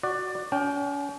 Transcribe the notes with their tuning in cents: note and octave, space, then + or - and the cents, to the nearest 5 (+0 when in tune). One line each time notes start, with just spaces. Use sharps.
F#4 +0 D5 +15
C#4 +40 G5 +0